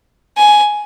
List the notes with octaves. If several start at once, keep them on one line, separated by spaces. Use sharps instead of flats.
G#5